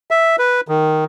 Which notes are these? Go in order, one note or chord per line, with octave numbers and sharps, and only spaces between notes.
E5
B4
D#3